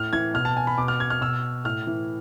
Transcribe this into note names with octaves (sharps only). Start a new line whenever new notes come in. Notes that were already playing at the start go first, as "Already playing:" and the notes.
Already playing: A2 F6
E3 G#6
B2 F6
A5
G#5
B5
B2 D6
F6
G#6
F6
B2 E6
A2 F6
E3